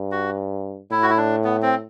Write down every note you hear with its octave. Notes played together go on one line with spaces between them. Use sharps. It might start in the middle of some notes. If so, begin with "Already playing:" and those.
Already playing: G2
F#4
A2 E4
F#4
E4
D4
B3
C4